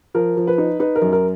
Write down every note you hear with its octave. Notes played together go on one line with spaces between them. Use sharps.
F3 A#4
F3
B4
D#4
D#4 B4
A#4
F#2
A#4